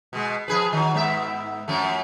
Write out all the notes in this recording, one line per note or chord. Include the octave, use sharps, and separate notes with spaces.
B2 G#3
F3 G#4 B4
D#3 F#3
G#2 B3 E5
F#2 F3 A3